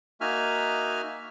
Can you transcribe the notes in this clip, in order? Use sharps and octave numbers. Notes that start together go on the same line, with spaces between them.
A#3 D#4 F#4 E5 G#5 F6